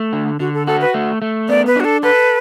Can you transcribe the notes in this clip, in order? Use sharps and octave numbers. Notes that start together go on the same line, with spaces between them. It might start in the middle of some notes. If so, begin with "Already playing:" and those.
Already playing: A3
D3
D3 F#4
A4
F#4 A4
B4
A3
A3
B3 D5
B4
D4 F#4
A4
A4 B4